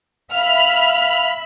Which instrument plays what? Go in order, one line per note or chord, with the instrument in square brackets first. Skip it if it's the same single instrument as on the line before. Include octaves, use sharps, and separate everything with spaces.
[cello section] E5 [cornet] F5 [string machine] B5 [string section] F6